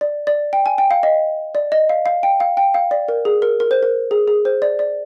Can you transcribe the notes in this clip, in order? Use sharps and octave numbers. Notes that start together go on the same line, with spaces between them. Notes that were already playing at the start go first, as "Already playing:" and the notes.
D5
D5
G5
G#5
G5
F5
D#5
D5
D#5
F5
F5
G5
F5
G5
F5
D5
A#4
G#4
A#4
A#4
C5
A#4
G#4
G#4
C5
D5
D5